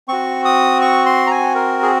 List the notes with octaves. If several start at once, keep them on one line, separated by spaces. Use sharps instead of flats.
C4 F#4 C#6
D#6
C#6
C6
A#5
G#5
A#4
G#4